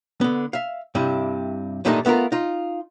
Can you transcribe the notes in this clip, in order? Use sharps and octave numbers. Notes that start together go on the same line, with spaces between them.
D3 B3
E5 F5
G2 C3 G3 E4
G2 A#2 D#3 A3 D4 D#4
A3 B3 D#4 F4 A#4
D#4 F4